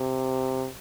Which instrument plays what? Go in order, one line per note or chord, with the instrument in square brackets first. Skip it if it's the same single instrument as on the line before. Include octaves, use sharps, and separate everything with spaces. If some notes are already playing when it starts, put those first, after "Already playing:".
Already playing: [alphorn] C3